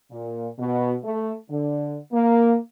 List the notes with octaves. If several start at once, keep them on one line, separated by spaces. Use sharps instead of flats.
A#2
B2
A3
D3
A#3